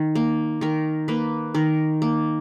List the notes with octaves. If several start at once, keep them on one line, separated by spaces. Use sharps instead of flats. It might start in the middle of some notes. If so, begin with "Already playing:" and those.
Already playing: D#3
A#3
D#3 A#4
A#3 B4
D#3 A#4
A#3